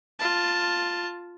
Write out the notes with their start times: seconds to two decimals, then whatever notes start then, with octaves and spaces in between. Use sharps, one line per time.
0.19 F4 A5